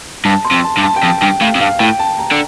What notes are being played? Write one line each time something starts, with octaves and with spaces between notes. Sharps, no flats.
G2 A5
C6
F2
A5
G2
A5
G5
F2 A5
G2 G5
A2 F5
F2
G2 F5
A2 G5
A5
A#5
D3